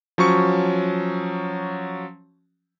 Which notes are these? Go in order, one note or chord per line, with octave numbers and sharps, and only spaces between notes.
F3 F#3 C#4 C#6 C#7